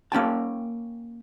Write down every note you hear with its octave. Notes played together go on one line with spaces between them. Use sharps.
A#3 C#4 G5 A5